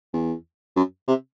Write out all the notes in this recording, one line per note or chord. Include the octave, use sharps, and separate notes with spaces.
E2
F#2
C3